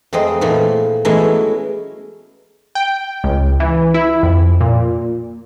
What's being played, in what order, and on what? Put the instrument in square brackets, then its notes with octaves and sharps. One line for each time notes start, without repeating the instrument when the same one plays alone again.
[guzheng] F2 G#3 A3 C4 D#5
A#2 E3 F3 A3
E3 F#3 G#3 A3 B3 C#4
[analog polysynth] G5
C#2
E3
E4
F2
A#2